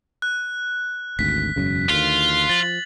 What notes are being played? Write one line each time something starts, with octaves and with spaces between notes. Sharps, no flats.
F#6
G#1 D2 B6
E1 F#2 C#3
D2 D#3 F4
F3 A6 F#7